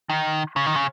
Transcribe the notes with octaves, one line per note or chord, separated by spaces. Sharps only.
D#3
C#3
D#3
C#3